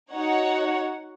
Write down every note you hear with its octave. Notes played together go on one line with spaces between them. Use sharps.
D#4 F#4 C#5 F#5